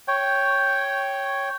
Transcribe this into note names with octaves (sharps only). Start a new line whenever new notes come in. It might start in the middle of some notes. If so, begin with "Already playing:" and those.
C#5 G5